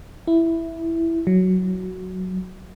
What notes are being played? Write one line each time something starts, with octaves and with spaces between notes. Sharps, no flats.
E4
F#3